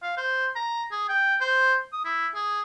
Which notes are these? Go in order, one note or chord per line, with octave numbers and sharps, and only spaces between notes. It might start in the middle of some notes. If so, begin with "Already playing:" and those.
F5
C5
A#5
G#4
G5
C5
D#6
E4
G#4